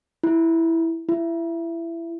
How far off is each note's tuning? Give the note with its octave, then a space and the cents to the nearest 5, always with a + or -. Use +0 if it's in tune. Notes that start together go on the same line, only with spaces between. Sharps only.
E4 -5
E4 +20